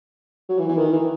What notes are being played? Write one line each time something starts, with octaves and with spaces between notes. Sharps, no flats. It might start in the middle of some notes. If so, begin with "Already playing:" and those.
F#3
E3
E3
D#3
E3